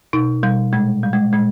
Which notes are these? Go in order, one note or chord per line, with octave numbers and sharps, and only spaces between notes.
B2 D#4
B2 G3
A#2 G#3
A#2 G3
G#3
A#2 G#3